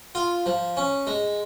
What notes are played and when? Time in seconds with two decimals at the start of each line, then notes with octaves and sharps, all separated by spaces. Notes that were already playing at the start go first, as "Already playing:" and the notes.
0.15 F4
0.46 F3
0.77 C#4
1.07 G#3